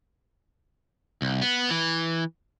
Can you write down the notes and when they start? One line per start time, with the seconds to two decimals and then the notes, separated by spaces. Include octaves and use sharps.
1.22 C2
1.42 B3
1.70 E3